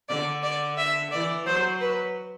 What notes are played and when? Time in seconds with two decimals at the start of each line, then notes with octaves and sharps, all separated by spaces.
0.09 D3 D5
0.43 D5
0.77 E5
1.12 E3 D5
1.46 F#3 C5
1.81 B4